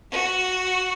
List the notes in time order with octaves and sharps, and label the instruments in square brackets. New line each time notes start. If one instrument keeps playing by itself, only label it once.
[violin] F#4